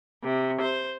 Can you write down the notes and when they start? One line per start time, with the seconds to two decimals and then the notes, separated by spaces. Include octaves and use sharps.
0.24 C3
0.61 C5